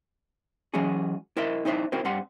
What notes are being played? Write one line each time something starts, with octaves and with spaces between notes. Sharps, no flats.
E3 F#3 G#3 C#4 F#4 G#4
E4 A#4 C5 D#5 E5
C4 D#4 E4 C5 E5
C4 E4 F#4 A#4 C5
G2 C4 G4 F#5 C6